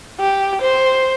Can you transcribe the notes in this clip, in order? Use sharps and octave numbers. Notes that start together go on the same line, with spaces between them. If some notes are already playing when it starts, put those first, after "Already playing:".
G4
C5